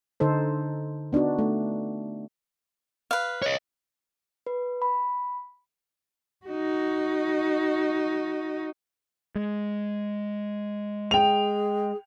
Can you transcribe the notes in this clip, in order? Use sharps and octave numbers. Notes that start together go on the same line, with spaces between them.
D3 D#4 A4 C5
B3 D4 D#4 F#4
A3
B4 F5
C#5 D#5
B4
B5
D#4 F#4
G#3
G#4 G5 F7